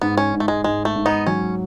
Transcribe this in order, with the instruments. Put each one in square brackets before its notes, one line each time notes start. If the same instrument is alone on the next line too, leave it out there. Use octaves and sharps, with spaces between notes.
[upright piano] G#2 [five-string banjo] B3
[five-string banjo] C#4
[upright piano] G#2
[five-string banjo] A3
G#3
[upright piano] G#2 [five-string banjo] G#3
[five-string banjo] A3
[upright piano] G#2
[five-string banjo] B3 D#4
[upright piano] F#3 [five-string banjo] C#4